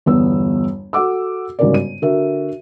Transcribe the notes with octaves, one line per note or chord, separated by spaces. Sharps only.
G1 E2 B3 E6
F#4 A4 F#5 D6 E6
G1 G#2 C#3 F#4 A#4 D5
D#7
D3 F#4 A#4 E5